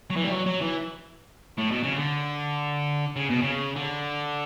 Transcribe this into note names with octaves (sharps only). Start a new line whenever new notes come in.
F#3
E3
G3
F#3
F#3
E3
A2
B2
C#3
D3
C#3
B2
C#3
D3